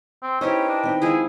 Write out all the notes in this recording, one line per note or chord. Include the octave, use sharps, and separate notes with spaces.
C4
C#4 D#4 E4 G4 B4 C5 D#5 G5
D4
D#3 C4
F3 G#3 E4 G#4